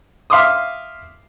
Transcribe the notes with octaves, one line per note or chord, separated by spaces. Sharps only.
E5 F5 C6 D6 D#6